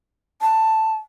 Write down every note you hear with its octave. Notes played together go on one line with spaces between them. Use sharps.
A5